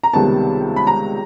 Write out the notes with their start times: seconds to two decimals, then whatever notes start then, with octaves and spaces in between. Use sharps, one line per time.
0.03 A#5
0.13 C#2 C3 D#3 G3 B3 A5
0.76 B5
0.87 A#5